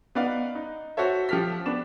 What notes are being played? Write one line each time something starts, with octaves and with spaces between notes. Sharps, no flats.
B3 D#4 B4 D5 F5 F#5
D#4
F#4 A4 C5 C#5 E5
F3 G4 A4 F6 B6
B3 D4 E7